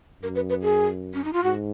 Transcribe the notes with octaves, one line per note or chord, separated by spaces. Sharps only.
F#2 A#4
B4
B4
G#4
C#4
D#4
F4
G#2 F#4